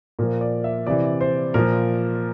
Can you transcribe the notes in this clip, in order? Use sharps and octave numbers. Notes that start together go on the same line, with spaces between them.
A#2 F3 A#4
D5
E5
C3 E3 D5
C5
A#2 F3 A#4